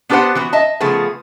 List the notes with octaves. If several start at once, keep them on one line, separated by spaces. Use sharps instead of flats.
B3 D4 G4 B4 C5 F#5
E3 B3 F#4
D#5 E5 A5
C#3 F3 A3 B3 G#4